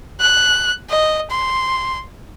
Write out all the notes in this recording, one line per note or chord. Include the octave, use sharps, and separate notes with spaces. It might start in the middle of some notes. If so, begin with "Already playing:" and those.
F#6
D#5
C6